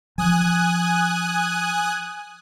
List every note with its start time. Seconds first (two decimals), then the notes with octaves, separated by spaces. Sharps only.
0.18 F3 G#5 D#6 F#6